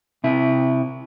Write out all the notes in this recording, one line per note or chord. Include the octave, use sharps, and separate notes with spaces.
C3 E4